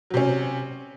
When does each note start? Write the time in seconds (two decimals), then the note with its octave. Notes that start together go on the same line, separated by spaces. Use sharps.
0.10 F#3
0.14 C3
0.17 C#4